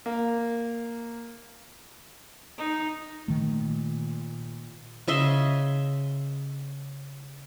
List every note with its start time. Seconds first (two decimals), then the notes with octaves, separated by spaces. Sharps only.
0.06 A#3
2.58 D#4
3.28 A#2 D#3 A3
5.08 C#3 D#5 E5 C6